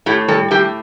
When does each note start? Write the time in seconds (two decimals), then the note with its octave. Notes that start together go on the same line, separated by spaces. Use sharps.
0.06 A2 G4
0.28 G3 A4
0.51 A2 G4